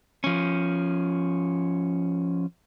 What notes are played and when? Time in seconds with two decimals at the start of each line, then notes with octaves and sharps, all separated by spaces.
0.24 F3 C#4